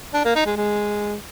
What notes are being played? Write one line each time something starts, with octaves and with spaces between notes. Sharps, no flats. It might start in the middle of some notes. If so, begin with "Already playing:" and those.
D4
A#3
D#4
G#3
G#3